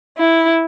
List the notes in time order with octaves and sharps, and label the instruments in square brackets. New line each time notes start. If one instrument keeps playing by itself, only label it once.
[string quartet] E4